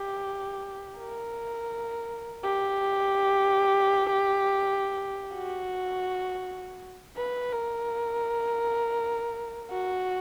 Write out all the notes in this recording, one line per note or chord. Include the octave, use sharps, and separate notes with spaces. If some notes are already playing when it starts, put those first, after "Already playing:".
Already playing: G4
A#4
G4
F#4
B4
A#4
F#4